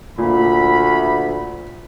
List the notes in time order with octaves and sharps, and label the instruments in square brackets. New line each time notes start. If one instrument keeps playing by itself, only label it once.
[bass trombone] D2 [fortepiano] A#2 [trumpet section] B5